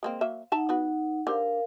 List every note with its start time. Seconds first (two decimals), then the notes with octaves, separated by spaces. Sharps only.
0.03 G#3 A#3 C4
0.21 F#3 A#3 E5
0.52 D#4 E5 F#5 A5 A#5
0.69 B3 F#4 B4
1.27 D3 G4 A#4 C5 F5